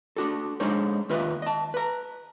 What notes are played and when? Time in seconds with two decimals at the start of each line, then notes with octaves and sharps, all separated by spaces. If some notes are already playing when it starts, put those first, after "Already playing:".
0.17 D4 F#4 A4
0.60 G#3 D4 D#4 C5 C#5
1.09 D#2 F4 B4 D#5 E5
1.42 D#5 A5
1.74 B4 A#5